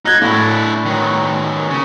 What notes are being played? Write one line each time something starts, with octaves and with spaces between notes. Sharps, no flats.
D#4 F#6 G#6
A2 D4 E4
D#3 F#3
C#3